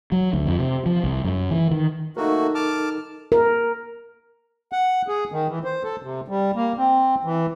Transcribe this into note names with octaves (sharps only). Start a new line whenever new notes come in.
F#3
D2
F2
C3
F3
C2
F#2
E3
D#3
A3 A#3 D#4 F#4 A4 A#4
A5 D6 F6
A#4
F#5
G#4
D#3
E3
C5
A4
C3
G3
A#3
C4
E3